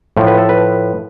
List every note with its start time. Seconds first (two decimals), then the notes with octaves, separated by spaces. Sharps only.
0.17 A2 F3
0.27 B4
0.38 A4
0.49 B4